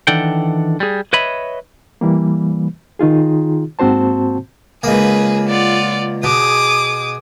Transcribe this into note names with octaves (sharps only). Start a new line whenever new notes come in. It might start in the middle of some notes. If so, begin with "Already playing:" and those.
D#3 E3 D4 A4 F#5 G5
G3 G#4
B4 C#5 D#5 E5 B5
E3 G3 A#3
D#3 D#4 F4 G#4
G#2 A#3 C4 F#4 C5 A5
C#2 A#3 G#4 B4
F4 D5 F#5
B2 G#4 D6 D#6